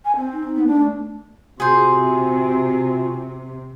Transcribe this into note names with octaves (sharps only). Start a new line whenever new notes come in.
G#5
C4
D#4
B3
A3 D4
C3 F4 F#4 G#4 C5